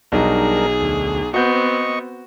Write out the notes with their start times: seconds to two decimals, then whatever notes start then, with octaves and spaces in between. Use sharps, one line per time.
0.12 B1 G3 D4 D#4 G#4 A#4
0.81 D2
1.34 B3 C4 F#4 D#5 C#6 G6